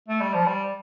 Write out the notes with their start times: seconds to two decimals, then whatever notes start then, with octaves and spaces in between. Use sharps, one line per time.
0.08 A3
0.21 G3
0.33 F3
0.46 G3